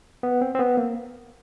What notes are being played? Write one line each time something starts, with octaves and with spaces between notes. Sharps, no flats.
B3
C4
C4
B3
A#3